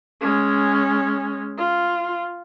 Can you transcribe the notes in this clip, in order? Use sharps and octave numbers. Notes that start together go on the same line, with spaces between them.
G#3 C#4
F4